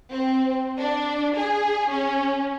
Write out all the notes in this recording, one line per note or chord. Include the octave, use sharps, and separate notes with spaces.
C4
D4
G#4
C#4